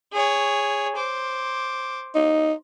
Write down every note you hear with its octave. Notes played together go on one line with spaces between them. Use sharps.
G#4 C#5
C5 D6
D#4